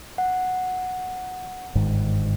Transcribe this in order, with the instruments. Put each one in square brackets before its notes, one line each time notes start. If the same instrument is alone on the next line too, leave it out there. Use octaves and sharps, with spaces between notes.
[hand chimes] F#5
[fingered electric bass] G1 G#2 D#3